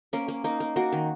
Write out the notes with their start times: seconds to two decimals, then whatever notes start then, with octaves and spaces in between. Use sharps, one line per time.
0.13 A#3 C#4
0.28 A#3
0.44 A#3 D#4
0.60 A#3
0.76 A#3 F#4
0.92 D#3